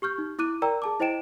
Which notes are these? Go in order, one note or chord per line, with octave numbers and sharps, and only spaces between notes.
G4 C#6 F6 G6
D#4
E4 D6 F#6 D#7
A#4 D5 G5 A#5 E6
G#4 A5 D6
E4 C5 D#5 G5 D7 E7